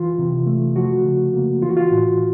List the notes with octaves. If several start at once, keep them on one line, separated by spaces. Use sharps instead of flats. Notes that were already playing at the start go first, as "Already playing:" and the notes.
Already playing: E3 F4
C3
A3
F3 F#4
C#3
A#3
E3 F4
F#4
F4
A2